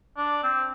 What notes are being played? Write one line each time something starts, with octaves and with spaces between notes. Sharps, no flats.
D4
C4